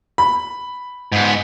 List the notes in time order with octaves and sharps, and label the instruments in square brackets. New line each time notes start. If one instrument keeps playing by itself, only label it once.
[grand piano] B5
[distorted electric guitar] G#2 B3